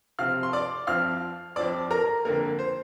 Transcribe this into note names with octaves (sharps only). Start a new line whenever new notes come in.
C3 F3 C4 F5 F6
C6
D5 D6
F2 F3 C4 F5 F6
F2 F3 C4 D5 D6
A#4 A#5
F2 D3 A#3 A#4
C5